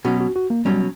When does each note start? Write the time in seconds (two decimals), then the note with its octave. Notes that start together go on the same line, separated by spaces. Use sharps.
0.05 B2 F#3 C#4 F#4
0.20 F#4
0.36 F#4
0.50 A#3
0.65 B2 F#3 G3 C#4